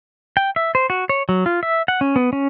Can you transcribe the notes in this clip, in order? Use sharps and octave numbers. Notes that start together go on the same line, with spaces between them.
G5
E5
C5
F#4
C#5
F#3
F4
E5
F#5
C#4
B3
C#4